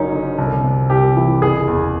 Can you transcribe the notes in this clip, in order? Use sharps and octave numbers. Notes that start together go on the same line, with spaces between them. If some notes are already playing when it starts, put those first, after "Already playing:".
Already playing: F#1 F#2 F#3 C#4 D#4
D3
C2
C3
C2 G4
E3
F#1 G#4
E2